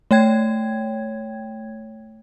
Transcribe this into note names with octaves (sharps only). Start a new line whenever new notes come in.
A3 C#5 G5 G#6